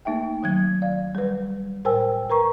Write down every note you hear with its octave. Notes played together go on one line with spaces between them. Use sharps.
A3 A#3 D#4 E5 G5
D#3 F#3 G#6
D5 F5
G3 B4
A2 A#4 C5 G5 G#5 E6
A#4 B4 A#5 C#6